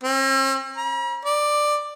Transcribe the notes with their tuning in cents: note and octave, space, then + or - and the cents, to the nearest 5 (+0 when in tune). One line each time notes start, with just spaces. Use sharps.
C4 +45
A#5 +45
D5 +10